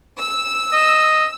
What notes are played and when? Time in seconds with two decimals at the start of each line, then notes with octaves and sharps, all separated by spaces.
0.18 E6
0.73 D#5